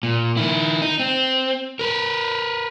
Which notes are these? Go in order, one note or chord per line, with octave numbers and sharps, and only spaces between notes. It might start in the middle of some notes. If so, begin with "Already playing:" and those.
A#2
D#3 E4
D#4
C4
A#4 B4